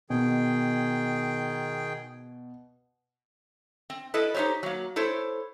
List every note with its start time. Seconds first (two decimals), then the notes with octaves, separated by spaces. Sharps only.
0.10 B2 D#3 G#4 G5
3.90 C4
4.14 E4 A4 B4 D#5
4.34 D#4 G4 G#4 C5 C#5
4.63 F#3 A#3
4.96 E4 A4 C5 C#5